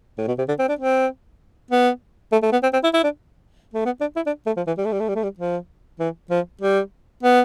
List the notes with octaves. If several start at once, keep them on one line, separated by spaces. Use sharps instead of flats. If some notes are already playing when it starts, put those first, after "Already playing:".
A2
B2
C3
D3
C4
D4
C4
B3
A3
A3
B3
C4
C4
E4
E4
D4
A3
B3
D4
E4
D4
A3
F3
E3
G3
A3
G3
A3
G3
A3
G3
F3
E3
F3
G3
B3